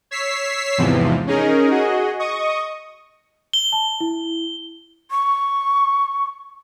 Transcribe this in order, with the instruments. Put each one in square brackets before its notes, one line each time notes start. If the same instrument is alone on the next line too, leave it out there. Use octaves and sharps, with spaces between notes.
[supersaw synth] C#5 E6 B6 C7
E2 G#2 C3 E3 F3
C#4 D#4 G#4 A#4
F#4 G#4 D#5
D#5 C#6 D#6
[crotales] G7
[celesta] A5
E4
[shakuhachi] C#6